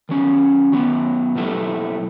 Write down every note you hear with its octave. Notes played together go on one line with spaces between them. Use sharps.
D#3 F#3 C#4
D#3 F#3 B3
B2 F#3 A3 E4